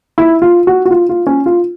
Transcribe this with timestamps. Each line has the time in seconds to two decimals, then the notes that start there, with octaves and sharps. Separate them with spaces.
0.18 E4
0.42 F4
0.67 F#4
0.85 F#4
0.90 F4
1.09 F4
1.27 C#4
1.46 F4